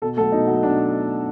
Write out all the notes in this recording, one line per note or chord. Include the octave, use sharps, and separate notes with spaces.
B2 A4
F#3 A3 A4
B2 D#4
F#3 A3
B2 D4